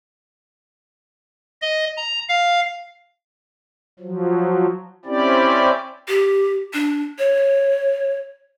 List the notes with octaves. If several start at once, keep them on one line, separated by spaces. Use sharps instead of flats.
D#5
A#5
F5
F3 F#3
C4 C#4 E4 G4 D5
G4
D4
C#5